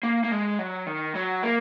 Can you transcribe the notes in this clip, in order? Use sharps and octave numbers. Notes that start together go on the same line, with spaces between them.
A#3
A#3
G#3
F#3
D#3
F#3
A#3